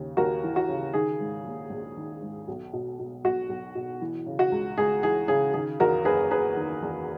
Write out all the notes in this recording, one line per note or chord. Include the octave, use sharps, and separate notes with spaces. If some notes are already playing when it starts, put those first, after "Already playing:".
Already playing: D#2 C#3
D#2 F#4 A#4
E3
F#4
C#3
D#3 G#4
G#2
A#1
A#1
D#3
G#2
B1
B2
B2
B1 F#4
B1
B2
E3
C#3
F#4
C#2
C#2 G#4
E3 G#4
C#3 G#4
D#3 G#4
E2 F#4 A#4
F#1 G#4 B4
F#1 G#4 B4
D#3
E2